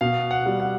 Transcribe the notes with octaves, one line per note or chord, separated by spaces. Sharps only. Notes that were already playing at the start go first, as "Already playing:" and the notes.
B2 F5
F#5
G3
F#5